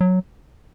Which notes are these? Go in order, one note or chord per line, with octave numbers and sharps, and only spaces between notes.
F#3